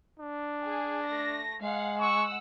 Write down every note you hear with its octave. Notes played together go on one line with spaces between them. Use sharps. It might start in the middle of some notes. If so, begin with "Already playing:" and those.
D4
G#4
A3 A#6
G#3 F5 F#5
F#5 C#6 E6